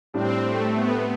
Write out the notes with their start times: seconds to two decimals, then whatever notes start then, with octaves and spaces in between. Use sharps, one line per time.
0.13 A2 G3 C4 D4
0.42 A3
0.71 B3